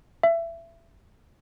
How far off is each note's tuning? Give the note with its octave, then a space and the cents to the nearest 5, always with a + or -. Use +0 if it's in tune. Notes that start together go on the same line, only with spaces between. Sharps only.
E5 +25